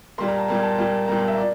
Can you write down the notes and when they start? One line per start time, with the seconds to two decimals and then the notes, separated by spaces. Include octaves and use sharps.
0.18 A#2 G3 A#3 C6
0.28 A#5
0.38 A5
0.48 A#2 G3 A#3
0.63 A5
0.78 A#2 G3 A#3
1.08 A#2 G3 A#3 A#5
1.18 A#5
1.28 E5
1.38 D5